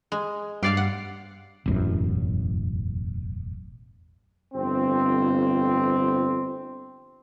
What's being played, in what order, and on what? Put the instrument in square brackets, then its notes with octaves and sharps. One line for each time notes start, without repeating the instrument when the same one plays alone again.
[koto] G#3
[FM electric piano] G2 C7 [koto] G4 D5 F5
[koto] F#5
[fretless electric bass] E1 A1 F#2
[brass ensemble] G1 F2 C4